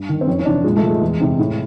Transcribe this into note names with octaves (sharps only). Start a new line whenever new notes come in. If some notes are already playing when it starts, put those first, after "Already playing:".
Already playing: G2
D#3
C4
F2 C#4
C#4
C3 E3 D4
A#2 G#3
A3
F3
G#3
E2
C3 E3
A2